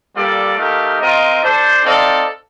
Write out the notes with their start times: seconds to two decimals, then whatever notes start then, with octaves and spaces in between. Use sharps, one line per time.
0.16 G3 A#3 F4 A4 D5
0.58 A3 D#4 G4 A#4 F5
1.00 C4 F4 A#4 D#5
1.43 D4 A4 C5
1.84 C4 D#4 A4 D5 F5